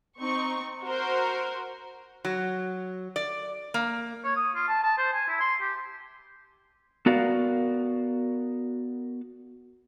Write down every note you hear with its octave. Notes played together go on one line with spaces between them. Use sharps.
C4 D#4 C#6
F#4 A#4 C5
F#3
D5
A#3
C#5
D#6
F4
A5
A5
C5
G#5
E4
C6
G4
B3 F#4 A#4 D5 F5